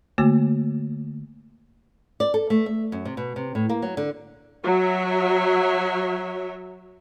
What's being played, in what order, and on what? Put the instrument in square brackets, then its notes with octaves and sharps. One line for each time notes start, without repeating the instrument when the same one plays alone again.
[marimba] D3 A3 A#3 F#4
[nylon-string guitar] D5
A4
A3
E5
F#2
C3
B2
C3
A2
A#3
F#3
D3
[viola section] F#3 C#5 E5